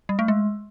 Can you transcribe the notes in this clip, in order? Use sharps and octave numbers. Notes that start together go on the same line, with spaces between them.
G3
A3
G#3